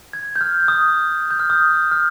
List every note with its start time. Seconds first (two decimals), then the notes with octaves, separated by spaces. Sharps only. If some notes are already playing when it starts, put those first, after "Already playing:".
0.13 G#6
0.36 G6
0.41 F6
0.68 D#6
1.31 G6
1.40 F6
1.50 D#6
1.91 F6